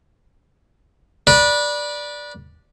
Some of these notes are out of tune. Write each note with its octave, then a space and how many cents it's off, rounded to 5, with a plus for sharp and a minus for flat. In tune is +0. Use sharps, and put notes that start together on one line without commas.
B4 -25 D5 +0